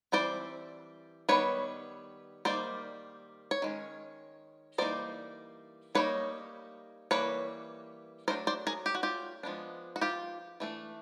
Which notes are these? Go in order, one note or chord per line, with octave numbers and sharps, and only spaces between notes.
E3 G3 C4 C5 D5
D#3 G3 B3 B4 C#5
D#3 G3 A#3 C5 D5
C#5
D#3 G#3 C#4
E3 G3 A#3 D#4 C5 D5
G3 A#3 D#4 B4 C#5
E3 G3 A#3 B4 C#5
F#3 A3 D4 A#4 C5
C5 D5
G#4 A#4
G4
F#4
F4 G4
F3 G#3 B3 D4
F#4
F4 G4
E3 A3 D4